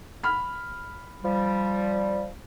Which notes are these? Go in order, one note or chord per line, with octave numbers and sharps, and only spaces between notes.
B5 F6
F3 G3